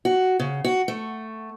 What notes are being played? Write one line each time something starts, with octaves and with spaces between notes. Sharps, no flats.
F#4
C#3
F#4
A3